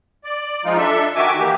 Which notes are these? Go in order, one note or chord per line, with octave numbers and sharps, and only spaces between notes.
D5
F3 G#3 D#4 F4
D4 A4 E5
D#3 F#4 E5 G#5 D6
E3 A#3 G4